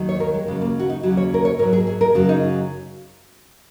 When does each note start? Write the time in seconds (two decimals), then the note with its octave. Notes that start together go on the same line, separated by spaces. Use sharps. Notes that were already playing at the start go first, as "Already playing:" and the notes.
Already playing: D#2 D#3 F#3
0.09 C#5
0.20 A#4
0.34 G#3
0.47 D#2 C#3 F#3 G#3
0.61 A#3
0.79 F#4
0.90 D#4
1.03 D#2 C#3 F#3 F#4
1.17 C#5
1.34 A#4
1.45 C#5
1.59 G#2 A#4
1.63 F#3
1.73 G#4
1.87 G#4
2.01 A#4
2.14 F#2 C#3 F#3 F#4
2.29 D#4